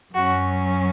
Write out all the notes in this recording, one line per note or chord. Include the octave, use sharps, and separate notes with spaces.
F#2 F#3 C#4 F#4